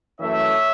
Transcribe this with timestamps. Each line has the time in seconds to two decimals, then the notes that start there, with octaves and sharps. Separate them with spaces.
0.19 F#2 E3 A3 C#5 E5